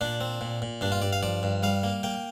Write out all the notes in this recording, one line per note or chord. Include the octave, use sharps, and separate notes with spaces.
A#2 D4
C4
A#2
A#2
G2 D4
F4
G2 D5
F5
F3 D5
G2
G3 F5
A#3
A#3 G5